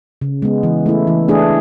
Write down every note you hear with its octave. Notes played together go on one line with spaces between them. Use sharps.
C#3
G#3 B3
E3
A3 E4
E3
A3 D4 G#4